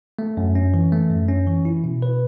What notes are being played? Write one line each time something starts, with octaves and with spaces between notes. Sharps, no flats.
A3
F#2
C#4
E3
A3
F#2
C#4
E3
E4
B2
B4